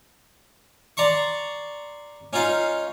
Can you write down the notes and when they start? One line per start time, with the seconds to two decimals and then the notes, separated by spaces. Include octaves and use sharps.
0.97 D5 A#5 C6 C#6
2.33 C#4 D#4 F4 F5